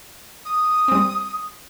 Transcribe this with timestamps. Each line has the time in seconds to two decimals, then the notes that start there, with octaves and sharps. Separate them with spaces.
0.45 D#6
0.88 G3 C4